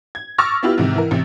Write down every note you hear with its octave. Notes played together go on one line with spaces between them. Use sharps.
G#6
C#6 D6 E6 F6 A6 A#6
B3 E4 F4 G4 B4
G#2 C3 D#3
E3 A#4
A1 C3